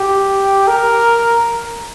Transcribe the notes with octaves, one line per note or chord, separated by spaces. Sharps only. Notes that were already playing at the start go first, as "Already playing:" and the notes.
Already playing: G4
A#4